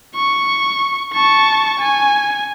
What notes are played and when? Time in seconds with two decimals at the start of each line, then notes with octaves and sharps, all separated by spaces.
0.16 C#6
1.14 A5 C#6
1.79 G#5